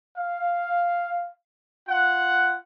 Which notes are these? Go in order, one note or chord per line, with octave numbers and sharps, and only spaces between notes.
F5
F4 F#5